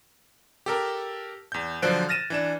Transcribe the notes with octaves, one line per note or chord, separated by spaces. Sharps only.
G4 A4 A#4
E2 G6
D3 F3 F#3 C5 F#6 D7
F6 A6 A#6 D#7 E7
E3 D4 E7